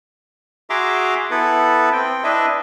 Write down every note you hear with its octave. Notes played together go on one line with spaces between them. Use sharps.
F#4 G#4 E5 A#5 C6 D6
B3 E4 A4 B4
C4 G5
D4 E4 B4 D#5 E5